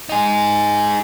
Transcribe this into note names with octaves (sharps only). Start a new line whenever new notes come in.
D#4 G#4